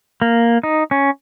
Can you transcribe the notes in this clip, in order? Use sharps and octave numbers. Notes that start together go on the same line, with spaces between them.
A#3
D#4
C#4